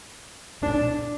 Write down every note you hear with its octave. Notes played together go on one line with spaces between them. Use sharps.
D4